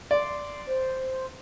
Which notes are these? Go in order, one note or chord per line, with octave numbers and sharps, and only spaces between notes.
D5 C6
C5